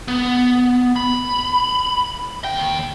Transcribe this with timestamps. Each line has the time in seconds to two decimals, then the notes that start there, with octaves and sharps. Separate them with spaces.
0.08 B3
0.96 B5
2.44 D#2 G5